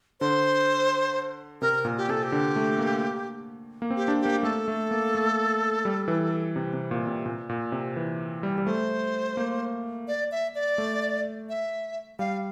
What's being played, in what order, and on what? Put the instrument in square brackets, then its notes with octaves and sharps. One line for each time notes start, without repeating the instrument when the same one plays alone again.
[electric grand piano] D3 [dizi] C5
[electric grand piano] C3 [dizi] A#4
[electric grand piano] A#2
[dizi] G4
[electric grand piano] C3 [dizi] A4
[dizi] G4
[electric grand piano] D3
A3
A#3
A#3
C4
[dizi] G4
[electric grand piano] D4
[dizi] G4
[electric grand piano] A#3
[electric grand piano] A3 [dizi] A4
[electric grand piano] A3
A#3
A3
G3
E3
C3
C3
A#2
C3
A#2
A#2
C3
E3
G3
G3
[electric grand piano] A3 [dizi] C5
[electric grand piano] A#3
[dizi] D5
E5
D5
[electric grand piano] A3
[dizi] E5
[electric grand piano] G3 [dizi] F5